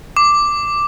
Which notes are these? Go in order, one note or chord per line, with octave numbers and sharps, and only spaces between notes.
D6